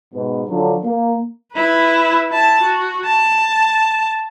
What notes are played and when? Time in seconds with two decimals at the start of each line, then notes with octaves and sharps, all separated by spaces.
0.14 G#2 B2
0.49 D3 F3 F#3 D4
0.85 A#3
1.54 E4 B4
2.30 E4 A5
2.62 F#4
3.05 A5